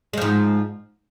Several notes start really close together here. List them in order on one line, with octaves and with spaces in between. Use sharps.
G#3 F3 G#2